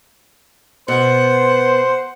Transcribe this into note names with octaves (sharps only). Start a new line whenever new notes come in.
B2 B3 C5 F#5